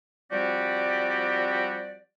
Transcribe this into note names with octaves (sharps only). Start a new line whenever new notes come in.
F3 G3 C4 F#4 G4 D5